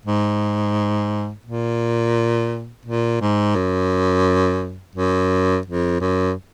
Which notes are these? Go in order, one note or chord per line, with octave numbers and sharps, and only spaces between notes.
G#2
A#2
A#2
G#2
F#2
F#2
F2
F#2